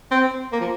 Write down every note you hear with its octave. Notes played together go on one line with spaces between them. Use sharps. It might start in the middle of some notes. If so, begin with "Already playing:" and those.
C4
A#3
F3